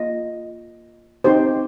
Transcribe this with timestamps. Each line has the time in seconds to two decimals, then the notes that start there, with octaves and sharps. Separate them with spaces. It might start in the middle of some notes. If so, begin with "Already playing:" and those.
Already playing: A#3 F4 D#5
1.24 C4 D#4 G4 C5